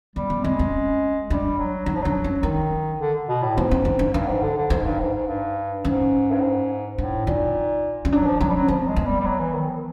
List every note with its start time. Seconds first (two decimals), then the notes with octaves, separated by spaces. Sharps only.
0.16 G3 B3
0.30 B3
0.44 G#3 C4
0.59 C#4
1.29 G3 D4
1.58 F#3
1.86 F#3 D#4
1.95 F3
2.03 F#3 D4
2.24 C#4
2.43 D#3 D#4
3.00 D3
3.29 B2
3.43 A2
3.57 G#2 B3
3.71 C4
3.85 C#4
3.99 D4
4.14 G2 D#4
4.28 G#2
4.43 D3
4.57 D3
4.70 G#2 D#4
4.85 G2
5.00 G#2
5.14 G#2
5.27 G2
5.85 G#2 C#4
6.32 G2
6.41 G#2
6.98 A2 D4
7.26 A#2 D#4
8.05 C#4
8.12 F#3 D4
8.26 F3
8.40 F#3 C#4
8.49 G3
8.55 F#3
8.68 F3 C4
8.88 G#3
8.96 B3
9.07 G3
9.20 G3
9.25 F#3
9.39 E3
9.53 D#3
9.68 F3